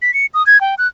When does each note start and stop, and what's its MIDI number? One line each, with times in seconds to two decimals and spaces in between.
0.02 0.14 95
0.14 0.26 97
0.34 0.45 87
0.47 0.60 92
0.61 0.75 79
0.78 0.87 90